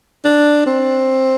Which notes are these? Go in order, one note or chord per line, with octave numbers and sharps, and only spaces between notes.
D4
C4